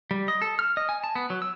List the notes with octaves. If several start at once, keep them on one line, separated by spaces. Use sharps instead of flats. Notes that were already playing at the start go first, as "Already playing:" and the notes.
G3
D#5
A4
F6
D#5
G#5
A5
B3
F#3
E6